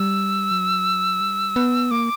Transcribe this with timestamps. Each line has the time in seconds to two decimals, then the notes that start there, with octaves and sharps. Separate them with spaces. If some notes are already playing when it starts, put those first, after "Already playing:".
Already playing: G3 E6
0.51 F#3
1.20 G3
1.56 B3
1.91 A#3 D6